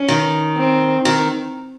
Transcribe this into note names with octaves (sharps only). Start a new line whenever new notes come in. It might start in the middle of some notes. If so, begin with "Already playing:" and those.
Already playing: C#4
D#3
C4
D#3